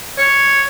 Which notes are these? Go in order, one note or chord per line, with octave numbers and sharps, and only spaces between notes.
C#5